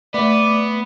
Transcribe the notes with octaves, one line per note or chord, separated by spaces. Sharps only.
A3 B3 D5